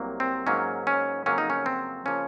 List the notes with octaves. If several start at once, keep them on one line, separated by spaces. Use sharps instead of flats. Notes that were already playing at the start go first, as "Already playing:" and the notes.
Already playing: C2 C3 F#3 A#3
C4
G#2 F#3 A#3 C#4
C#4
F2 C#3 F#3 A#3 C#4
D#4
C#4
C4
C#3 F3 A#3 C#4